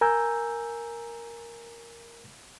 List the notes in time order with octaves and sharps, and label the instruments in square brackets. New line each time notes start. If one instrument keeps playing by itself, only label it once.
[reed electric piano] A#4 G#5 A#5 E6 G6